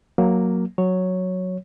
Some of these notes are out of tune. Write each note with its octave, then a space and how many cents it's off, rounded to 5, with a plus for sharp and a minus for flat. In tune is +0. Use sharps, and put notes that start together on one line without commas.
F#3 -5 A#3 +0
F#3 -5 C#5 +0